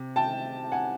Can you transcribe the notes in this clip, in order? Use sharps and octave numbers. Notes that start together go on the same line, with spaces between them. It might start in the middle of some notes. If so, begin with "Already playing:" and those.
Already playing: C3
G5 A5
F#5 G#5